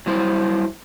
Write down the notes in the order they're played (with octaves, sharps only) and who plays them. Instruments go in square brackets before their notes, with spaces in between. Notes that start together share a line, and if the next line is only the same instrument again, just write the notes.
[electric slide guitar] F#3 G3 E4 C5